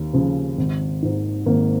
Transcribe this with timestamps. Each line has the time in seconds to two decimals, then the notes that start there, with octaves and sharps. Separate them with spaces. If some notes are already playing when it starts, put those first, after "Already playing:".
Already playing: D#2
0.13 C#3 F3
0.58 G#1
1.03 G#2 D#3
1.46 G#1 A#3